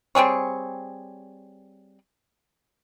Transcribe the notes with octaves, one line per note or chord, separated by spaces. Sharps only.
G3 C4 G#4 C#5